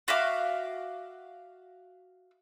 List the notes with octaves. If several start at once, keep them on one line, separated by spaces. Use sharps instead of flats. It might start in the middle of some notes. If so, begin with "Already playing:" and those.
F#4 E5 F5 D6